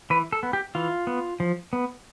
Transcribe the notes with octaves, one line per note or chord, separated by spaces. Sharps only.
E3 B4
A4
B3
G4
E3 F4
B3
F3
B3